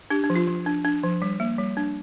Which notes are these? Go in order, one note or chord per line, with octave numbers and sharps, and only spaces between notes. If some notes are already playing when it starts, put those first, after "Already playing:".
D4 G4
D4
F3
F4
F3
D4
D4
F3
G3
A#3
G3
D4